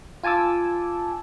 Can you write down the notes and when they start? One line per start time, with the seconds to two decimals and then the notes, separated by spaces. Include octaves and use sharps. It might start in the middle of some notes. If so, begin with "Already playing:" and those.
0.23 F4 G#5 A5 D6 E6